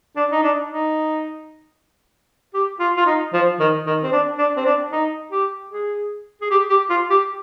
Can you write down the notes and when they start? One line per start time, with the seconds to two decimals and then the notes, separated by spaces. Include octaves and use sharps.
0.16 D4
0.31 D#4
0.43 D4
0.69 D#4
2.54 G4
2.80 F4
2.97 F4
3.06 D#4
3.33 F3
3.60 D#3
3.87 D#3
4.03 C4
4.12 D4
4.38 D4
4.57 C4
4.65 D4
4.92 D#4
5.31 G4
5.71 G#4
6.41 G#4
6.51 G4
6.70 G4
6.90 F4
7.10 G4